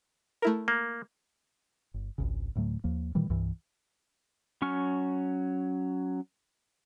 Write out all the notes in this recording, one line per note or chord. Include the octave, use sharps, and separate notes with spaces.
A3 E4 A#4
A#3
G1
G#1 C#2 C#3
D2 A2 F#3 A3
D#2 F3 A#3
A#2 D#3 E3 G3
C2 G2 E3
F#3 C#4 C#6 F6